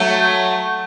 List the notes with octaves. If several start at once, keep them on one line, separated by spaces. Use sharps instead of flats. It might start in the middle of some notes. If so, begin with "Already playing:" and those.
Already playing: F#3 A3